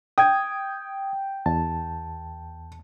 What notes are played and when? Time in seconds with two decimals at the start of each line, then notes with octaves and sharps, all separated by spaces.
0.18 G5 D#6 G#6
1.46 E2 A5